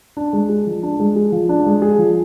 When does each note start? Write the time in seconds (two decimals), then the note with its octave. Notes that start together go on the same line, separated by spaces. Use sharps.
0.17 D4
0.33 G#3
0.49 G#4
0.67 F3
0.83 D4
1.00 G#3
1.16 G#4
1.32 F3
1.49 D4
1.66 G#3
1.82 G#4
1.99 F3